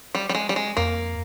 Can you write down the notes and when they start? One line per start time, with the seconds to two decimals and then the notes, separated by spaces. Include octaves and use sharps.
0.15 G3
0.29 G3
0.35 G#3
0.49 G3
0.56 G#3
0.77 F2 A#3